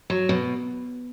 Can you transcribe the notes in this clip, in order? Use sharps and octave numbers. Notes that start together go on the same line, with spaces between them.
F#3
B2